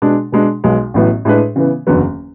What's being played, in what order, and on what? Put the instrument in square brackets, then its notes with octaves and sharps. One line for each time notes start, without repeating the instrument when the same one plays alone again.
[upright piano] B2 G#3 D4
B2 G#3 D4
B1 B2 G#3
A1 A2 F#3 B3
A2 G#3 D4 G#4 B4
C#3 E3 B3
F#1 E2 D3 F#3 B3